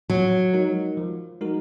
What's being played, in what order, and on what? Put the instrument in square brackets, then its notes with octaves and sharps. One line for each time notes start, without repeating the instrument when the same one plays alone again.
[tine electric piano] F3 [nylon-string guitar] F#3
[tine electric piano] G#3 D#4 F#4 A#4
F3
G#3 D#4 F#4 A#4